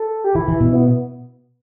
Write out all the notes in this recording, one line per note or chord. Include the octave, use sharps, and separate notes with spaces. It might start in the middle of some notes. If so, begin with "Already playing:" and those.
Already playing: A4
G4
E3 E4
E3
B2
B3